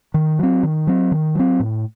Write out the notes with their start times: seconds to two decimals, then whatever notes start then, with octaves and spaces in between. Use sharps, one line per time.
0.14 D#3
0.39 F#3 C4
0.63 D#3
0.87 F#3 C4
1.12 D#3
1.35 F#3 C4
1.60 A2